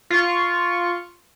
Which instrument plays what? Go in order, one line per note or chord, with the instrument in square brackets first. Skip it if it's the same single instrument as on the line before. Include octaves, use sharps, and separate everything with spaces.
[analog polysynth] F4 C#6